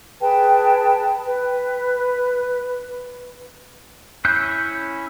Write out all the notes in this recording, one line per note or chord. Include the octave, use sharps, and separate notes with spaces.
G#4 B4 G5 A5
B4
C#4 E4 F#6 G6